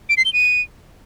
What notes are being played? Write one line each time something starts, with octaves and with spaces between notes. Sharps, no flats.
D7
C7
G7
D#7